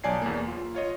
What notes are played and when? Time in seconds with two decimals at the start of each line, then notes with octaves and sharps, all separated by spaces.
0.04 B1 C#5 D5 G#5 A5 C7
0.22 E2 A#3
0.48 F4
0.75 F4 C#5 D#5